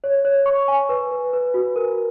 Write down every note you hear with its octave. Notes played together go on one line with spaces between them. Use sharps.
C#5
C#5
C#6
G#5
B4
B4
B4
F#4
A#4